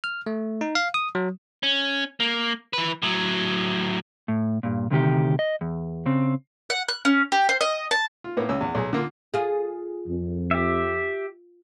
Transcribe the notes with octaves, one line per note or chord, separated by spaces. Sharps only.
F6
A3
D#4
F5
D#6
F#3
C#4
A#3
E3 B4
A2 F#3
A2
G2 A#2
D2 C3 D#3 G4
D#5
E2
C#3 C4
F#5
F#6
C#4
G4
C5
D#5
A5
F4
A2 A#3 B3
C#2 C#4 E6
E2 F#5
B1 G#4
D3 A#3 F4
F4 G#4
F2
G4 E5